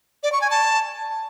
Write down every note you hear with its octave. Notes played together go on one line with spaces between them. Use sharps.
D5
C#6
G#5
A5